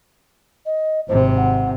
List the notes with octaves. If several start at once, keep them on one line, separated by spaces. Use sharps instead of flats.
D#5
G#1 C3 C5
F#5